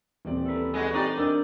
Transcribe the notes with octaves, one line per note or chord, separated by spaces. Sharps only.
D#1 E3 C4 D5
A4 B4
G#3 F#4
C4 D#4 G4 D5
D4 A#4 E6 G6